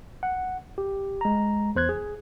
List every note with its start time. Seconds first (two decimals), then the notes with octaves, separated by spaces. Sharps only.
0.23 F#5
0.78 G4
1.21 G#3 A#5
1.76 E2 C5 F#6 G#6
1.89 G#4